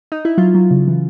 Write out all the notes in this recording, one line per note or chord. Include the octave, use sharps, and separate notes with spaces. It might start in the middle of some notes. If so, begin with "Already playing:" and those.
D#4
E4
F#3 F4
F#3
C#3
E3